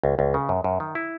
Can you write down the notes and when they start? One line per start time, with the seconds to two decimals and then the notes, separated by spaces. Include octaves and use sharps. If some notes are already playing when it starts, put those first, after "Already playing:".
0.04 C#2
0.19 C#2
0.34 C#3
0.49 F#2
0.64 F#2
0.80 D#3
0.95 E4